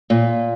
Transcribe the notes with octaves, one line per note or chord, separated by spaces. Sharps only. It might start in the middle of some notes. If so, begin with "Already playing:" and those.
A#2